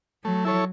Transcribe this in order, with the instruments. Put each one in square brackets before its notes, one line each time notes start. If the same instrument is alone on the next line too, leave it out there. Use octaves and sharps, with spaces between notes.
[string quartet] F#3 [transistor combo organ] A3
[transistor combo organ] E4 A4 C#5